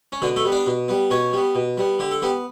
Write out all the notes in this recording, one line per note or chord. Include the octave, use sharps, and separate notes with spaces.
C#4
B2 D3 D4
A3 A4
G3 B3
D4 D5
B2
G3 B3
B2 C#4 C#5
G3 B3
B2
G3 B3
D3 G4
A4
G3 B3 G4